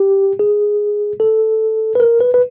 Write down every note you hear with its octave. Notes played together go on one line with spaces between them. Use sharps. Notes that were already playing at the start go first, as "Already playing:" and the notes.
Already playing: G4
G#4
A4
B4
A#4
B4
B4